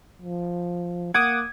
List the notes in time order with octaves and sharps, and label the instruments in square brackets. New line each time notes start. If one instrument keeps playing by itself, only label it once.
[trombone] F3
[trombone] A#3 [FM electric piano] F#5 D6 D#6 [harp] G#6